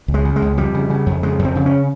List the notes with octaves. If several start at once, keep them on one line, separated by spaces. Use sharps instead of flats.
C#2
G#3
C#3
G#3
C#2
F2 G3
C#3
C#3
F2
C#3 G#3
F2
C4
C#3
C#4